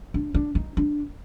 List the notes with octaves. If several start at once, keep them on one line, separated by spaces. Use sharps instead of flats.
D4
D4
D#4
D4